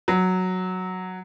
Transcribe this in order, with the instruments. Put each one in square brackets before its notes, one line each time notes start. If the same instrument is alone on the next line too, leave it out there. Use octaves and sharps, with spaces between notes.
[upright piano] F#3